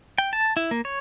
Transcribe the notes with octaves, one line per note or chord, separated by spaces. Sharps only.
G5
A5
E4
A#3
C#5